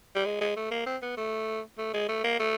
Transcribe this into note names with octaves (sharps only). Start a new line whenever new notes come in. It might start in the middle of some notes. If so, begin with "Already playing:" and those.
G3
G#3
G#3
A3
A#3
C4
B3
A3
A3
G#3
A3
A#3
A3